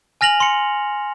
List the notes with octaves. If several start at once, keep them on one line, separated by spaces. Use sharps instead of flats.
G#5 F6 A#6 F7 F#7
C6 C#7